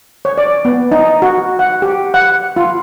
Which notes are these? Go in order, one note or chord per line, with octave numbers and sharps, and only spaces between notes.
C#5
D5
B3
D#4
F#4
F#5
G4
F#5
F4